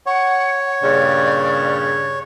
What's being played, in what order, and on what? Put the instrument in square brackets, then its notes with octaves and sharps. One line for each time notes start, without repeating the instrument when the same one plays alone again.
[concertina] C#5 [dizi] F#5
[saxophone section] G2 A#2 C#3 [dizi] D5